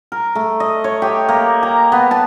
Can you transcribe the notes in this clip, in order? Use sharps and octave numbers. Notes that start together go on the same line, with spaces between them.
A#4
A3
D#5
C#5
G4
A#3
A#5
B3
A5